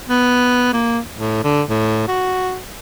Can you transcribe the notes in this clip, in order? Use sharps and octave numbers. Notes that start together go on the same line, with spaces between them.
B3
A#3
A2
D3
A2
F#4